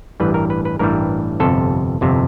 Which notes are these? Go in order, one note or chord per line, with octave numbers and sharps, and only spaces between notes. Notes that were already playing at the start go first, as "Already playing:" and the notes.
A1 G2 E3 G3 B4
A#4
B4
B4
A1 G2 E3 G3 A#4
G1 F2 C3 A4
G1 F2 C3